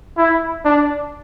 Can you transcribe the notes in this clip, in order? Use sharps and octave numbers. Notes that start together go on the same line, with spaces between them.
E4
D4